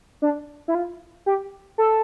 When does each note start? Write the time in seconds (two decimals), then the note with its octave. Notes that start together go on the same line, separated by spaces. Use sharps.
0.22 D4
0.68 E4
0.75 F4
1.26 G4
1.78 A4